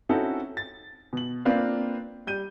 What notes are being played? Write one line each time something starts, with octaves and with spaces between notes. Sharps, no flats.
C4 C#4 D#4 E4 F#4 A4
A6
B2 F#7
A#3 C4 D4 F4 B4 F5
G3 G6 D#7